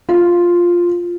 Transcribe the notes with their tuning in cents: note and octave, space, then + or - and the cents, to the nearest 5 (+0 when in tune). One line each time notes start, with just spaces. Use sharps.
F4 +0 F5 +0